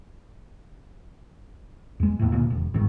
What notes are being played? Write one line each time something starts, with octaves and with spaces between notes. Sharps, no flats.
E2 G#3
D#2 A2
D2 A#2
E1
G1 G#2 D#3